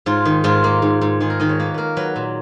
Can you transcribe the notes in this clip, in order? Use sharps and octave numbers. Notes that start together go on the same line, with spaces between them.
G#2 F4
D#3
G#2 F4
A#3
G#2
G#2
D#3 G#4
A#4
D#3 D#5
C#5
A#3 B4
A#3 A#4 B4
F#3 B4
A#2